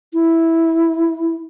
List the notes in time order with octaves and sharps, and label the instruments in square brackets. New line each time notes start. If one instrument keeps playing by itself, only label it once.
[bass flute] E4